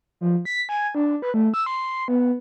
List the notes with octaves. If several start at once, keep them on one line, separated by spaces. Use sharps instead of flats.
F3
B6
G#5
D4
B4
A3
E6
C6
B3